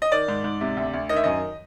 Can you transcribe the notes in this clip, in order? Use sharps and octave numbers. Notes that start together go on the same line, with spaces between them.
D#5
D#3 D5
G#2
G#2
C3
D2
D2
D#3 D#5
E5
F#2 D#5